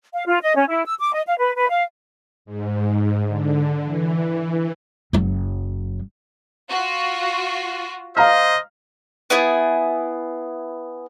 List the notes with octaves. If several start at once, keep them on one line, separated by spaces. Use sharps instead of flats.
F5
F4
D#5
C#4
E4
E6
D6
D#5
F5
B4
B4
F5
G#2
D3
E3
F#1 F#3
F4 F#4
C5 D#5 F5 A#5 F6
B3 E4 G#4